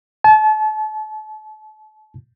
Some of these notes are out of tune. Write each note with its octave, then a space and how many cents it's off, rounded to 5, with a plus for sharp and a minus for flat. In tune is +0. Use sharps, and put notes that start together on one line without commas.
A5 -35